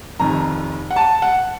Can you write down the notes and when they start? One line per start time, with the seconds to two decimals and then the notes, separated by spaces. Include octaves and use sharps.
0.20 F1 F2 D#3 A#5
0.91 F#5
0.96 A5
1.22 F#5